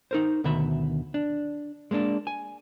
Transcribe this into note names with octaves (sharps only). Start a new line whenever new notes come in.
D#4 A#4 C5
D2 B2 D#3 E5 B5
D4
G#3 A#3 C#4 D4
G#5